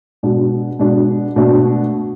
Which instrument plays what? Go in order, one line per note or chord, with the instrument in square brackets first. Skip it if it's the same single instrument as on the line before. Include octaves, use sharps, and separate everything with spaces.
[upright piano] B2 G#3 D4
B2 G#3 D4
B2 A3 D4